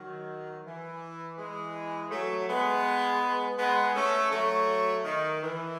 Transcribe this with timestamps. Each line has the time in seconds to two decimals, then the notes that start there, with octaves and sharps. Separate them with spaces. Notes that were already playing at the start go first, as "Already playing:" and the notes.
Already playing: D#3 F#3
0.65 E3
1.37 E3 G#3
2.11 F#3 A3
2.48 G#3 B3
3.58 G#3 B3
3.94 A3 C#4
4.31 F#3 A3
5.05 D#3
5.42 E3